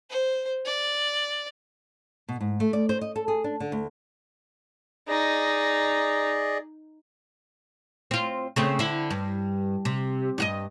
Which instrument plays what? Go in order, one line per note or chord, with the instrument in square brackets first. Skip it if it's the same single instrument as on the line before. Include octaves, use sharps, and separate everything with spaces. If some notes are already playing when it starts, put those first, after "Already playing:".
[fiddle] C5
D5
[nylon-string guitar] B2
G#2
A3
D5
C5
D#5
A4
G#4
D4
D3
D2
[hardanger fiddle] D#4 [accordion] G#4 D5 D#5
[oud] C4 F4
C#3 A3 C4
D3 E4
G2
C3
G2 F#4 D#5